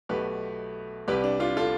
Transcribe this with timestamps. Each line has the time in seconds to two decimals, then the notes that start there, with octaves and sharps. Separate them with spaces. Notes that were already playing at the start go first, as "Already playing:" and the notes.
0.09 B1 B2 A3 G4 B4
1.08 C2 C3 G3 G4 B4
1.24 D4
1.40 D4 F4
1.57 F4 A4